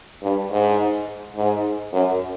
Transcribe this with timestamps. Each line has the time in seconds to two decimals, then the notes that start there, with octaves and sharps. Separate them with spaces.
0.22 G2
0.51 G#2
1.36 G#2
1.93 F#2